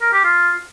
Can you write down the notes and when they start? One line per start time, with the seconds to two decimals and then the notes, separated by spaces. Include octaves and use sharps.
0.01 A#4
0.13 G4
0.24 F4